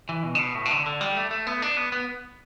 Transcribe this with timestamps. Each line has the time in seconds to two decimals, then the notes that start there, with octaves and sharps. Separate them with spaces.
0.09 E3
0.23 B2
0.35 D3
0.39 B2
0.55 A2
0.65 B2
0.71 D3
0.86 D3
1.01 G3
1.17 A3
1.31 A3
1.47 B3
1.62 D4
1.77 B3
1.92 B3